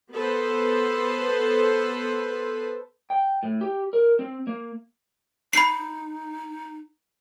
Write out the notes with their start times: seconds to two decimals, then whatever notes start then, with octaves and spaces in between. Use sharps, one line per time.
0.12 B3 A4 B4 C5
3.10 G5
3.43 A2
3.61 G4
3.93 A#4
4.19 C4
4.47 A#3
5.53 D#4 B5 C7